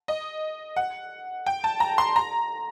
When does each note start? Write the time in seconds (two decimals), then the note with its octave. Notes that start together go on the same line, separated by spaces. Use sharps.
0.08 D#5
0.76 F#5
1.46 G5
1.64 A5
1.80 A#5
1.98 C6
2.16 A#5